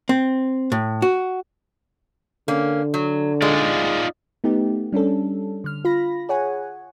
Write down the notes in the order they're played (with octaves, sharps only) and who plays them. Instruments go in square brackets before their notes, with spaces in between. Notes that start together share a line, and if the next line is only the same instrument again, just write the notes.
[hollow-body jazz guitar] C4
A2
F#4
[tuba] D3 [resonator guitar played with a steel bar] A#3 C#4
[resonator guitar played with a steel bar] F#3
[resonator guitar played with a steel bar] G#3 [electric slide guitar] D#4 F4 D5
[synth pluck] A3 B3 D#4 G4
G3 C#4 D4 A4
D3 F6
F4 B5 A#6
G#4 C#5 F#5 G#5